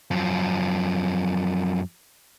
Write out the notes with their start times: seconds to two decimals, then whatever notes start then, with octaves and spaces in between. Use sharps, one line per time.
0.11 F#2 F3